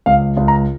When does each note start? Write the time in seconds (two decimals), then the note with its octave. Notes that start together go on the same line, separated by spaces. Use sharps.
0.06 C#2 F5
0.37 C#2
0.48 A#5